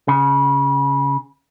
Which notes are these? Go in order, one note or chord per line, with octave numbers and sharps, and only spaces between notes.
C#3